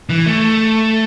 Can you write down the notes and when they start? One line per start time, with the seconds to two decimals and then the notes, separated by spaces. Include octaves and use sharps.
0.09 E3
0.26 A3